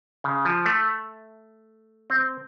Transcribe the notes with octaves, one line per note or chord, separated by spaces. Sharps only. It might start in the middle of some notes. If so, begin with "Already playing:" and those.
C#3
F3
A3
C4